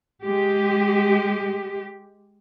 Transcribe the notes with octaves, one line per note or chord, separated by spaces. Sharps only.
G#3 G4